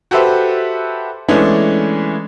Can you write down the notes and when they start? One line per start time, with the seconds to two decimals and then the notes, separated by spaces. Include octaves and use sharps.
0.11 F#4 G4 A4 B4 C5 E5
1.28 E3 G#3 A3 B3 C#4 D4